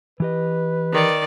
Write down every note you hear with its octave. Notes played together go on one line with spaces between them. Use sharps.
E3 G4 B4 D#5
D#3 D5